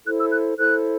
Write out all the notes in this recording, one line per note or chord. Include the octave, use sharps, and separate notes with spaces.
E4 A4 C5 F#6
E6
F#6
E4 A4 C5 F#6